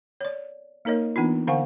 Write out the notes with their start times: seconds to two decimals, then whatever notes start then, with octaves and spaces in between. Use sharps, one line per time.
0.21 C#5 D5
0.85 A#3 D#4 A#4 C#5 D#5
1.16 E3 B3 D4 D#4 F4
1.47 D3 C5 F5 F#5 G#5 C#6